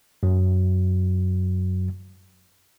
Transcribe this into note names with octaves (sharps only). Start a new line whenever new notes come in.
F#2 F#3